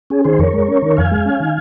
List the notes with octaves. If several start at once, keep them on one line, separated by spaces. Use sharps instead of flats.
C#4 G#4
D#3 G#4 C5
F2 A#4 C#5
G#3
C#4
D#3
F2 F5 G#5
G#3
C#4
D#3